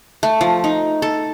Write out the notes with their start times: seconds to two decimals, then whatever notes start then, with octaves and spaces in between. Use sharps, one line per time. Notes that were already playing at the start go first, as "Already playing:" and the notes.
0.23 A3
0.41 F3
0.64 D#4
1.02 A4